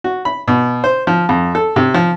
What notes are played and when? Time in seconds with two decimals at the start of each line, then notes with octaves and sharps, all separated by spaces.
0.04 F#4
0.25 B5
0.48 B2
0.84 C5
1.07 F3
1.29 F2
1.55 A4
1.76 C3
1.94 F3